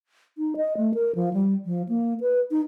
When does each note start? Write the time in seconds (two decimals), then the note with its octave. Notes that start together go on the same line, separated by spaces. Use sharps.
0.38 D#4
0.56 D#5
0.77 A3
0.94 A#4
1.15 F3
1.33 G3
1.65 F3
1.89 A#3
2.21 B4
2.51 D#4